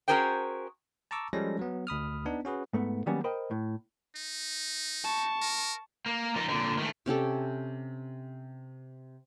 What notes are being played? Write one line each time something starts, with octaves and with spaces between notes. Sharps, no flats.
C#4 F#4 G#4 A#4 C5 G5
A5 A#5 C#6 D6 E6
F3 G3 G#3 C#4 A4 A#6
F#3 B3
D2 B5 D#6 F6
B3 D4 D#4
C#4 F#4 G#4 B4
G#2 A3 B3
D#3 F#3 G3 A#3 B3 C#4
A#4 C5 D#5 G5 B5
A2
D#4
A5 C#6
A#4
A#3
F3 D#4
A#2 D3
D#3 A3
C3 C#4 G4 A4